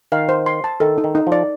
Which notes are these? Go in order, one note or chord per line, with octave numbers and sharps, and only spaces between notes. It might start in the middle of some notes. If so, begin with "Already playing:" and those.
D#3 F5
C5
C6
A5
D#3 A4
D#4
D#3
D#4
F3
D5